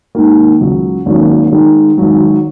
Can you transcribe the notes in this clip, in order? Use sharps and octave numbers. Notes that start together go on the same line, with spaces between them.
G#2 D#3 A#3
C#2 C#3 F#3
G#1 G#2 F#3 A#3 C#4
G#2 D#3 G#3
G#1 G#2 F#3